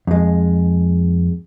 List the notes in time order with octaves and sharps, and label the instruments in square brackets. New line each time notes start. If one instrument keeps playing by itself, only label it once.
[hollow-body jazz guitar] F2 G#3